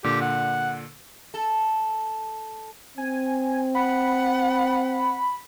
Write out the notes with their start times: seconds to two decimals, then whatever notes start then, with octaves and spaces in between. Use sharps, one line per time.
0.04 A#2 D3 G4
0.22 F#5
1.34 A4
2.98 C4 G#5
3.75 F#5 B5